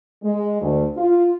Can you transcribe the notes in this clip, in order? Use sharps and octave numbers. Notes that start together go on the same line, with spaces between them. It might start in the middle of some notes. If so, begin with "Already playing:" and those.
G#3
D2
F4